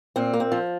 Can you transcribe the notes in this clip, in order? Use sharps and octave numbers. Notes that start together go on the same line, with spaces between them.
A#2 C4
A#3
C4
F3